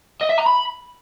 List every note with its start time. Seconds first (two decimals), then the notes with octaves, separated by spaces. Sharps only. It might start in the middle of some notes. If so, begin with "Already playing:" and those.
0.21 D#5
0.30 E5
0.38 A#5
0.47 B5